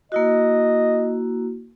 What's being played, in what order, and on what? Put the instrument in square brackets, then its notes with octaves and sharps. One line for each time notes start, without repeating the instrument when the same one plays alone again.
[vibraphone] A#3 E4 F#4 [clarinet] D#5